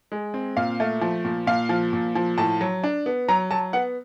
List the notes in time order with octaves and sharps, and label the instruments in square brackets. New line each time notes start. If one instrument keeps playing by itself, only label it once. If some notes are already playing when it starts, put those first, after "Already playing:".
[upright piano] G#3
C4
A#2 F5
A3
F3
A#2
A#2 F5
F3
A#2
F3
A2 A5
F#3
D4
B3
F#3 A#5
F#3 A5
B3 F#5